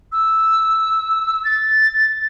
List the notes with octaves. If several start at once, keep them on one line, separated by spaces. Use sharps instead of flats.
E6
A6